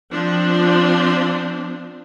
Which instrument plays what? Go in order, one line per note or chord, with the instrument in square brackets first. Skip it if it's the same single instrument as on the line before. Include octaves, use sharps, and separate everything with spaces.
[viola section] F3 C4 D4